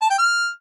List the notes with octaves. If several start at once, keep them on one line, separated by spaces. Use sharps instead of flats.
A5
G5
F6